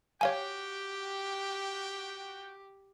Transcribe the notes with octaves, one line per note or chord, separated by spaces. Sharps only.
F#4 G4 C#5 F5 G5 G#5